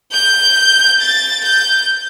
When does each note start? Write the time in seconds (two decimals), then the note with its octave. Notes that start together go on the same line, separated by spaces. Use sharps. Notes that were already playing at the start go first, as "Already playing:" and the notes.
0.12 G6
1.00 A6
1.44 G6